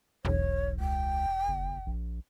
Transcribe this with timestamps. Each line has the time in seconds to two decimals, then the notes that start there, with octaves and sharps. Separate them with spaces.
0.25 E1 B1 C#5
0.80 C#2 G5
1.48 F#1
1.86 A#1